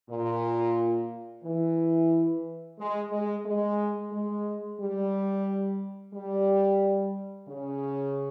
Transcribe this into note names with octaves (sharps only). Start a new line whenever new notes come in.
A#2
E3
G#3
G#3
G#3
G#3
G3
G3
C#3